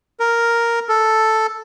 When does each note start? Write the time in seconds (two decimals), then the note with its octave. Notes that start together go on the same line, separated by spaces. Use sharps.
0.20 A#4
0.89 A4